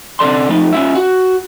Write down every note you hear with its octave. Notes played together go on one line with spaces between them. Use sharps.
C3 D4 A4 D5 C6
F3 A3 D#4
C#4 F4 E5
F#4